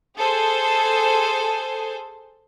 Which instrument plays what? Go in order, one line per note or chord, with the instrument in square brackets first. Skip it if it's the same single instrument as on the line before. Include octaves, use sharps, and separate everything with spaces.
[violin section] G#4 A4 C5